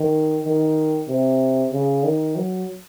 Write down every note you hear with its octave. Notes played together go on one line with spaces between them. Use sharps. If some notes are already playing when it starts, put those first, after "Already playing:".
Already playing: D#3
D#3
C3
C#3
D#3
F#3